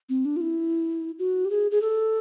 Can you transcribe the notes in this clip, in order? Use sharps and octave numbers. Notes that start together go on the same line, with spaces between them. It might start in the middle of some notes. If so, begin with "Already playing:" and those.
C4
D4
F4
E4
F#4
G4
G#4
G#4
A4